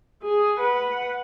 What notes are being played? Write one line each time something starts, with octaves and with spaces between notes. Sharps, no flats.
G#4
B4 F#5